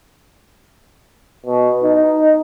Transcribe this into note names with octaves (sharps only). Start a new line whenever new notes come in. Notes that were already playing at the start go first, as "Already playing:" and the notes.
B2
D#4